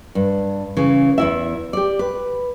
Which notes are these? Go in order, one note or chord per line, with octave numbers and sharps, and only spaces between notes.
G2
C#3 E3
E2 E4 E5
G4 D5
B4